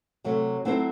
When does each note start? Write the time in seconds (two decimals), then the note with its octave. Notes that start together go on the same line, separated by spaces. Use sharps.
0.24 C3 F#3 A3
0.65 F#3 A3 C4 E4 C5